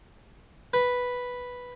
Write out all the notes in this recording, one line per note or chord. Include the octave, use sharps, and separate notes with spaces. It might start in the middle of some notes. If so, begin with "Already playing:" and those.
B4